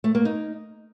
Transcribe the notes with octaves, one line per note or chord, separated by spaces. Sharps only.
A3
A#3
D#4